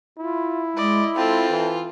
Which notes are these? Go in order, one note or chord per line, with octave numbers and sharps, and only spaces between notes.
E4 F4
G#3 D5 D#5
C4 F4 A4 A5
E3